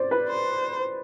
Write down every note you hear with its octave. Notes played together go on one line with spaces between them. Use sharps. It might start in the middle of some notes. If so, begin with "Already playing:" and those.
Already playing: C5 D5
B4
C5